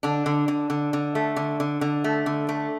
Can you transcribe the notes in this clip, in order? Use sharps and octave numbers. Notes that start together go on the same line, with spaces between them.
D3 D4
D3
D3
D3
D3
A3
D3
D3
D3
A3
D3
A3